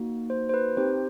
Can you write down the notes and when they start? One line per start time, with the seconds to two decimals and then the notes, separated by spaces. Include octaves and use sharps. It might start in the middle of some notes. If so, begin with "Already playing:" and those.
Already playing: A#3 D#4 F#4
0.30 C5
0.49 C5
0.54 B4
0.77 C4 D#4 G4 C5